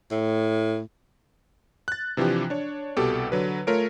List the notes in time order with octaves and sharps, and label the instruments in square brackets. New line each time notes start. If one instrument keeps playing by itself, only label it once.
[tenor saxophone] A2
[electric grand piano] F#6 A6
C3 E3 F3 D4 G4
D4 C#5
C2 B2 G4 A4 D6
D3 F#3 B4
A3 F4 A#4 C#5 D7